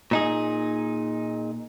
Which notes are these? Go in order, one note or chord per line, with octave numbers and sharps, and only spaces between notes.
A#2 D#4 G#4